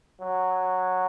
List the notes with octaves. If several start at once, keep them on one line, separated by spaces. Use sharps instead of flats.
F#3